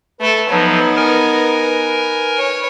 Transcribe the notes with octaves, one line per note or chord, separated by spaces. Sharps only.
A3 A4 B4
F3 F#3 B3 D#4
A#4 G#5
C#5